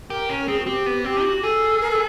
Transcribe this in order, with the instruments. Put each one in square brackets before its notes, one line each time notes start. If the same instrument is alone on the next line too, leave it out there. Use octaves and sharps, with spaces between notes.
[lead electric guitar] G4 [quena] A#4
[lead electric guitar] C#4 [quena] A#4
[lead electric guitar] C4 [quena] G#4
[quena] F#4
[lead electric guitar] C4 [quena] G4
[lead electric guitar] B3
[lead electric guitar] C4 [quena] G4
[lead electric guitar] F#4
[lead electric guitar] G#4 [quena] A4
[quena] A#4
A4